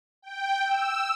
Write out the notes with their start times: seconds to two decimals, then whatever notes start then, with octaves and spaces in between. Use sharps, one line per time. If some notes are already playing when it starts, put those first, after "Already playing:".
0.22 G5
0.65 E6